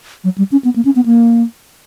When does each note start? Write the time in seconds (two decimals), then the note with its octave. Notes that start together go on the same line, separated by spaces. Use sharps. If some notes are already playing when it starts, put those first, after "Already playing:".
0.24 F#3
0.38 G3
0.52 C#4
0.65 B3
0.76 A#3
0.85 C#4
0.96 B3
1.06 A#3